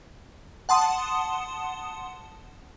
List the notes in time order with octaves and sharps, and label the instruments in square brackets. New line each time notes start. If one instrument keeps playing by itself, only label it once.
[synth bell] F#5 A5 C6 D#6